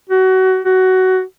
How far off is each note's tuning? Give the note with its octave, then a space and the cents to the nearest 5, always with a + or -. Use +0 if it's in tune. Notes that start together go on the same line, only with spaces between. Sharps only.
F#4 +25
F#4 +15